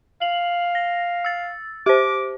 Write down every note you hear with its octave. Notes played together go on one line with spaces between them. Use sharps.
F5 F#7
A#6
E6 A6
G4 C5 D6